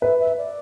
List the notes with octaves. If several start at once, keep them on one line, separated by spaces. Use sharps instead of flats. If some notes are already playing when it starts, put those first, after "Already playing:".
B4 E5
E5
D5